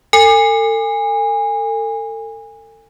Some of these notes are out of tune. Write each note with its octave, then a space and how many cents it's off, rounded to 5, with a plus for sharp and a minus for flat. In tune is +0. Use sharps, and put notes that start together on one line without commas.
A4 +35 G#5 -25